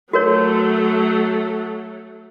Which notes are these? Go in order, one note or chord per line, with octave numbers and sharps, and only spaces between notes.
F#3 A3 F#4 A#4 C#5